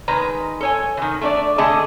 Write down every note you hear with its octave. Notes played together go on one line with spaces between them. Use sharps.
D#3 G#3 B4 A#5
A4 C#5 G#5
D#3 E3
A3 D4 D5
D3 A3 G#4 D#5 A5